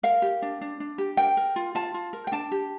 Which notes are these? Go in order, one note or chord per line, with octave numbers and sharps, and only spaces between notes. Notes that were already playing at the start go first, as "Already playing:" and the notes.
A#4 F5
G4
D4
D4
D4
G4
A#4 G5
A#4
F4
F4 A5
F4
A#4
G5
D4 A5
G4